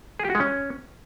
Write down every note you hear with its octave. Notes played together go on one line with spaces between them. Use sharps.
G#4
G4
F#4
G#3
C#4